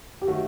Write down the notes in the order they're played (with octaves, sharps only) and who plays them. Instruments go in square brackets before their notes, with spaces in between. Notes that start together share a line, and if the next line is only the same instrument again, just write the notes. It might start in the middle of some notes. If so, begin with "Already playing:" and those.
[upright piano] G4
[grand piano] D#3 F#3 A3 [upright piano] F#4